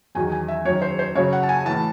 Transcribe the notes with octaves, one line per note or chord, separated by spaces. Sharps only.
E2 D#3 F#3 G#5
G#5
E5
F#2 D#3 F#3 C#5
C5
C5
F#2 C#3 F#3 C#5
F#5
A5
G#5
A2 E3 A5